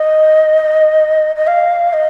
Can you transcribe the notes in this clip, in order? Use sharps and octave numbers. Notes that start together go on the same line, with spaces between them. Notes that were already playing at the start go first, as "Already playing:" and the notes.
Already playing: D#5
D#5
F5
D#5